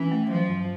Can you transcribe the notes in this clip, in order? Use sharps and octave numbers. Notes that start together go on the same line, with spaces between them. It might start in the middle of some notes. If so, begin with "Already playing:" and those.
Already playing: E3 C#4
A3
F3 F#3
G2